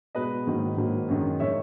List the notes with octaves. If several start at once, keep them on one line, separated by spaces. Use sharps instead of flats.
B2 G#3 B4 D#5
G#2 D#3 F#3 A#3
G#2 D#3 F#3 A#3
F#2 D#3 G#3
D#3 G#3 C#5 E5